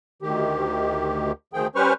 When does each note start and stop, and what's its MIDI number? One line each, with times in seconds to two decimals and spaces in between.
0.22 1.32 38
0.22 1.32 51
0.22 1.32 67
1.53 1.67 38
1.53 1.67 51
1.53 1.67 53
1.53 1.67 68
1.53 1.67 79
1.75 1.93 55
1.75 1.93 61
1.75 1.93 71
1.75 1.93 72
1.75 1.93 85
1.75 1.93 89